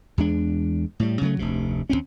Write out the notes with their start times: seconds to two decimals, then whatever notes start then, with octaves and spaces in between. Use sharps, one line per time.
0.18 E2 G#3 D4
1.00 A2 G3
1.21 C#3 F#3 G3 A3
1.39 F1 D2 C3
1.90 D#2 A#2 C4 C#4